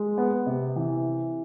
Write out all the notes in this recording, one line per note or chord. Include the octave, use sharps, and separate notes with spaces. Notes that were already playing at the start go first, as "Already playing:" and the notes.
Already playing: G#3
B3
C3
E3